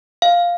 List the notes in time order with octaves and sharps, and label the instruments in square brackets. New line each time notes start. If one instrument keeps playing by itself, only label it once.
[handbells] F5